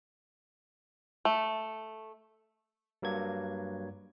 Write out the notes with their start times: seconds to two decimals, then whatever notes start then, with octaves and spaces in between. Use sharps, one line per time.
1.25 A3
3.02 G2 F#3 A#3 G#6